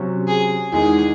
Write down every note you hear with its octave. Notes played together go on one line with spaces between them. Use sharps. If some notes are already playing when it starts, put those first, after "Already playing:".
Already playing: C3 F#3 C#4
G#4
E2 D#3 G#3 D#4 G#4